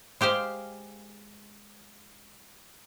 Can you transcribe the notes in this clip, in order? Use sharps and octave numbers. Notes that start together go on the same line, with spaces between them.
G#3 G4 C5 F5